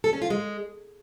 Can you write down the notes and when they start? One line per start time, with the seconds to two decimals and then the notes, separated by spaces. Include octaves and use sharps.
0.04 A4
0.13 C#4
0.22 F4
0.30 G#3